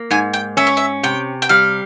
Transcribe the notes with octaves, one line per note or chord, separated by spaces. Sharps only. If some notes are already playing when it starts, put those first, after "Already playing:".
Already playing: A#3
G#2 G#5
G5
C#4 E5
C#5
E5
C3 G5
G5
G3 F5